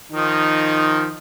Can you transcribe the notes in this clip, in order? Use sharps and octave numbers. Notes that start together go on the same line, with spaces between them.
D#3 F3 D#4